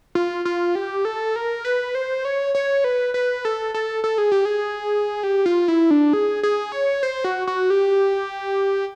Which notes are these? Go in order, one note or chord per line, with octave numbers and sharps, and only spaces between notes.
F4
F4
G4
A4
A#4
B4
C5
C#5
C#5
B4
B4
A4
A4
A4
G#4
G4
G#4
G4
F4
E4
D4
G#4
G#4
C#5
C5
F#4
F#4
G4